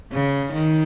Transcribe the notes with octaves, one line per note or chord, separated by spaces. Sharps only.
C#3
D#3